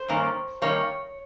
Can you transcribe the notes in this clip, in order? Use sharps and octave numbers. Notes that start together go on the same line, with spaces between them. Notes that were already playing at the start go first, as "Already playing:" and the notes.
Already playing: C5
G2 D#3 A#3 C#4
D#3 G3 A#3 C#4 C#5